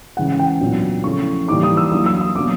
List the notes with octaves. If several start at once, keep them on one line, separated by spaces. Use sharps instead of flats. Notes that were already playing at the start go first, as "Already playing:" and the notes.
C#3 E3 G#3 C#4 F#5
F#5
G5
A#2 F#3 B3 D4
C#3 F3 A3 C#4 E4 C#6
E3 G3 A#3 D#4 D6
D#6
E6
F#3 A#3 D4 D#6
E6
D#6
B2 F#3 A#3 D4 D6